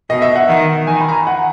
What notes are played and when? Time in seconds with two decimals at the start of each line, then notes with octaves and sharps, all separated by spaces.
0.10 B2 D#5
0.22 E5
0.36 F#5
0.48 D#3
0.87 D#3 G#5
1.01 B5
1.09 A#5
1.13 G#5
1.27 F#5